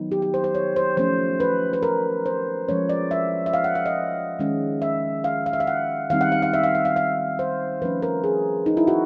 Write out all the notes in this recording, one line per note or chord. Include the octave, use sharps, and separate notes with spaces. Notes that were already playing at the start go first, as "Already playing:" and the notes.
Already playing: D#3 F#3 B3 D#4
G4
G4
C5
C5
C#5
C5
F3 A3 C#4 C5
B4
B4
A#4
C5
F3 G#3 C#4 C#5
D5
E5
E5
F5
F#5
F5
D#5
D#3 G#3 C#4
E5
F5
F5
E5
F5
F#5
D#3 G3 C4 D#4 F5
F#5
F5
F5
E5
F5
E5
F5
F5
C5
F3 A3 C#4 B4
A#4
G#4
D#4
E4
F#4